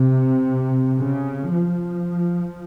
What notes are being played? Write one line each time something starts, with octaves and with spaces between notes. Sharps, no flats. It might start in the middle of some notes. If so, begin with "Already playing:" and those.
Already playing: C3
C#3
F3